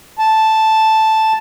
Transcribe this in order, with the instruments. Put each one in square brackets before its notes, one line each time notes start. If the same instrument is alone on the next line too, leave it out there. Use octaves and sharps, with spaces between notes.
[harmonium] A5